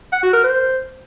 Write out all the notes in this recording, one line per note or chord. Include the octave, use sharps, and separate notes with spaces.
F#5
F#4
A#4
C5